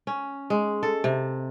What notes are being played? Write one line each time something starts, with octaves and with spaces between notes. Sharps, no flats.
C#4
G#3
A4
C3